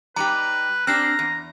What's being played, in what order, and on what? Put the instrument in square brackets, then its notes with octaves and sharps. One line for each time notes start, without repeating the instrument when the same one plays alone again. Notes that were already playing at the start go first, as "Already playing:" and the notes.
[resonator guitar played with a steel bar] G3 D#4 G4 [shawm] B4 [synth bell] A#5
[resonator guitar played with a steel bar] C4 D4 G4 [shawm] A#5 [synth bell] F6 F#6 C7
[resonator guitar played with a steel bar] E2